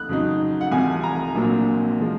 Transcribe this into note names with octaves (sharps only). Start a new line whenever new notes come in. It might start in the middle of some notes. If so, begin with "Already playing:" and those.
Already playing: F#6
F2 C#3 F#3 C4 D#4
F#5
C2 C3 F3 G#5
A#5
A#1 A#2 F#3 C4
F3 G#3